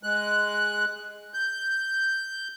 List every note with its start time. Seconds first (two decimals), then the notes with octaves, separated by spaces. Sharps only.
0.03 G#3 F#6
1.34 G6